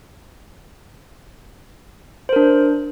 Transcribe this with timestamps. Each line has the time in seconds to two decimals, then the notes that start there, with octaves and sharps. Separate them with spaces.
2.29 C5
2.33 A#4
2.36 D4